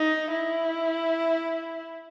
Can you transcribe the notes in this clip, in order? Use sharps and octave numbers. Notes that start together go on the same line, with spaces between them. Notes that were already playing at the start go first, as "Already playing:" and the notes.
Already playing: D#4
E4